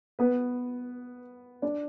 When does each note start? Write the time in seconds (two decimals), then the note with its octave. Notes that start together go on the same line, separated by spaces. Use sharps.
0.19 B3 B4
1.62 D4 D5